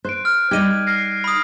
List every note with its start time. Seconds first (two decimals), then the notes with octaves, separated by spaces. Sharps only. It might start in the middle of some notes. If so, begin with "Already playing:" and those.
0.05 C5 F#6 D7
0.25 F6
0.51 G3 D#4 G4 G#6 D#7
0.87 F6 A#6 C7
1.24 B5 D#6